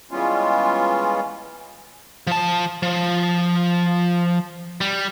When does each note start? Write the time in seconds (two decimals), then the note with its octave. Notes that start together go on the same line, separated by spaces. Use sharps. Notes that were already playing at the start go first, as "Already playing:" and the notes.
0.11 E3 G3 G#3 B3 C#4 F4
2.27 F3 A5
2.83 F3
4.81 G3